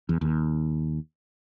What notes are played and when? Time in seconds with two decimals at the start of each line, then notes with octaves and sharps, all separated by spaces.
0.09 E2
0.21 D#2